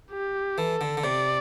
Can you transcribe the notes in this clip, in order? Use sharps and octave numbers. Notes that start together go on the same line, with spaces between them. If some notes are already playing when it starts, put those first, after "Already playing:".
G4
E3 A4
D3
D3
C3 D5